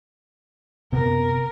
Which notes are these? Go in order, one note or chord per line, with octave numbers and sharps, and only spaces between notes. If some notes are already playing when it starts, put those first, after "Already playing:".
F#1 C3 B3 A#4